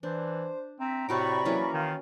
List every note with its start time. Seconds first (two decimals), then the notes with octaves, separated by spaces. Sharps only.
0.03 E3 D4 C5
0.80 C4 E5 A#5
1.09 A2 C3 F#4 D5 B5 C#6 D6
1.45 E3 F#3 A#3 C#4
1.74 D#3 F4